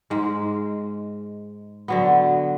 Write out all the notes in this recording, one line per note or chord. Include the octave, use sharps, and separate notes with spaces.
G#2 G#3
D3 F#3 B3